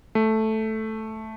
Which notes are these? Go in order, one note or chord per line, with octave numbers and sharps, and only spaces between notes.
A3